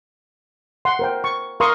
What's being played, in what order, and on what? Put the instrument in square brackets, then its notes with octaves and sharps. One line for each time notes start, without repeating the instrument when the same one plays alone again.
[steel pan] F#5 C6
A#4 C5 G5
C#6
A#4 F5 C6 C#6 D#6